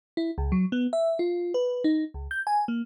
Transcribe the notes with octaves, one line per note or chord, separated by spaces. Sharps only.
E4
C#2
F#3
B3
E5
F4
B4
D#4
C#2
G6
G#5
A#3